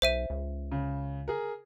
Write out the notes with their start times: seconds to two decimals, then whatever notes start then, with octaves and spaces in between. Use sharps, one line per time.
0.02 B1 C5 E5 D#7
0.30 C#2
0.72 C#3
1.28 G#4 A#4